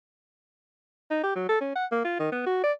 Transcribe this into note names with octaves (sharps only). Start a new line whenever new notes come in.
D#4
G4
F#3
A4
C#4
F#5
A#3
F4
D#3
B3
F#4
D5